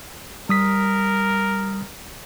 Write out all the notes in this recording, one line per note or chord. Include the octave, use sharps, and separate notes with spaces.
G3 A#4 D#6 B6